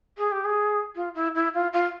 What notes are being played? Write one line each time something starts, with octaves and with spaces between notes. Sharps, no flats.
G#4
G4
G#4
F4
E4
E4
F4
F4